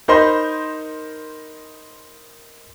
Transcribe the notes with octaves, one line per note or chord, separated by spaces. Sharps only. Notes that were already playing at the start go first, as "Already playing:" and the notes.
D#4 A#4 C5 D#5 B5 C6